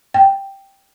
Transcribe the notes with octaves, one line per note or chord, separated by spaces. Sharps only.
G5